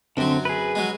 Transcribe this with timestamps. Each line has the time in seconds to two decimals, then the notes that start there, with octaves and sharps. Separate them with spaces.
0.17 F#2 D3 F#3 C4
0.45 G#4 B4
0.75 F#3 G#3